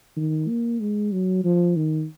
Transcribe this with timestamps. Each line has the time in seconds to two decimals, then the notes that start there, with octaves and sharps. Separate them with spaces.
0.17 D#3
0.49 A#3
0.80 G#3
1.12 F#3
1.44 F3
1.76 D#3